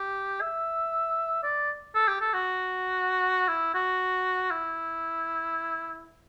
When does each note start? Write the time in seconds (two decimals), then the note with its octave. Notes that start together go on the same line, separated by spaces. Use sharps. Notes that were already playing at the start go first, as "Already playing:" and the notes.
Already playing: G4
0.41 E5
1.43 D5
1.95 A4
2.08 G4
2.21 A4
2.34 F#4
3.48 E4
3.74 F#4
4.51 E4